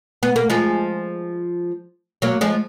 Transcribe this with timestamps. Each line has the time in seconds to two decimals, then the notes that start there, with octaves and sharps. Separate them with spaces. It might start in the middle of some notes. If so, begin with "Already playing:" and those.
0.23 B3
0.36 A#3
0.50 F3 G#3
2.22 F#3 A#3
2.41 F3 G#3